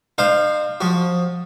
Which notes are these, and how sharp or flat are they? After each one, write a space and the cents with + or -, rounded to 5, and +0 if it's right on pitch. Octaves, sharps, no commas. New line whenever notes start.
D#4 -45 C5 +0 F5 +0
F3 +20 F#4 +15